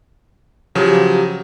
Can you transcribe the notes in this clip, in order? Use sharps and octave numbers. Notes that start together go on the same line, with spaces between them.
C#3 F3 F#3 G4